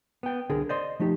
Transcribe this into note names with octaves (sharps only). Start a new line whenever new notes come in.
B3 G5
C2 D3 G#4 A#4
C5 D5 D#5 C6
F3 A3 D#4 G4